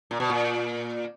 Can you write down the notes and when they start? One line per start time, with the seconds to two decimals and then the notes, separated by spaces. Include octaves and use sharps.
0.11 A#2
0.20 B2
0.30 A#2